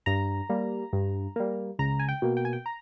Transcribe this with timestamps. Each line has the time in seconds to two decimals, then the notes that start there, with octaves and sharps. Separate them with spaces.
0.06 G2 A#5
0.50 G3 A#3
0.93 G2
1.36 G3 A#3
1.79 C#2 A#5
1.99 G#5
2.08 G5
2.22 B2 A#3
2.37 G5
2.45 G#5
2.53 G5
2.66 A#5